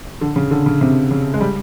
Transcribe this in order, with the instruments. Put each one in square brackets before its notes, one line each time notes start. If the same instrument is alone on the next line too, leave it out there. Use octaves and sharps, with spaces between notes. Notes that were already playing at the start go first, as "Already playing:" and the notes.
[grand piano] D3
C#3
D3
C#3
C3
C#3
G#3
G3